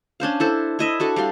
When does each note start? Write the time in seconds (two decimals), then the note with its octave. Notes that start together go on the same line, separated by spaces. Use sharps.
0.20 C#4 D4 C5 F5
0.40 E4 A4 C5
0.79 E4 D#5 E5
1.00 D4 F#4 A4
1.16 G3 D5 F5 C6